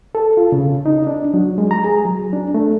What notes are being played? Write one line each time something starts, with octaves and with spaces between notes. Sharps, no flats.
A4
F4
C#3
D#4
D4
F#3
G#3
A#5
G#4
F#3
D4
A3